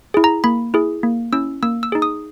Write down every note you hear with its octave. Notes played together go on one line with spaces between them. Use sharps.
E4 G#4
A#5
A#3 B5
E4 G#4
A#3
C#4 E4 E6
A#3 E6
E6
D#4 G#4
D#6